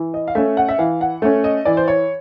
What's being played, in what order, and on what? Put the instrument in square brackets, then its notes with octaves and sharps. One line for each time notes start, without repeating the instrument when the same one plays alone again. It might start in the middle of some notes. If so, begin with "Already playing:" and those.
Already playing: [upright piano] E3
D#5
F5
A3 C#4 E5
F#5
E5
E3 F5
F#5
A3 C#4
D#5
E3 D5
C5
C#5